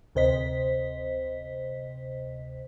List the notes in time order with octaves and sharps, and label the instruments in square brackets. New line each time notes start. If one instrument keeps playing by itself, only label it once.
[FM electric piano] D2 C3 C5 D#5 B6